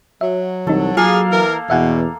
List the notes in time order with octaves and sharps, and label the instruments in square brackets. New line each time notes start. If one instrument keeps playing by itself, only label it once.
[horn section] F#3 [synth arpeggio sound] E5
[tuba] C2 [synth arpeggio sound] E3 D#4 [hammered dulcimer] A4
[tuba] F#3 [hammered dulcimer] A#3 A4 F5 [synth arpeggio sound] F4 [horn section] G#4
[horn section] E3 A#4
[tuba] E2 [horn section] B2 [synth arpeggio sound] E5 F#5 G#5